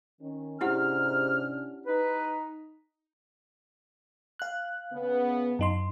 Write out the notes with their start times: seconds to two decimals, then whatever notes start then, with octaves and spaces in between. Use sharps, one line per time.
0.21 D#3 C#4
0.61 G#2 C3 C#4 D4 E4 G4 F#5 F6
1.86 D#4 B4
4.39 F5 F#6
4.93 C#3 B3
5.59 F#2 D#4 C6